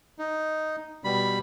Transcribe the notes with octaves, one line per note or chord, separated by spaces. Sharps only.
D#4
B2 G3 B5